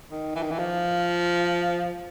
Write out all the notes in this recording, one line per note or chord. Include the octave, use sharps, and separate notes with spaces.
D#3
E3
D#3
E3
F3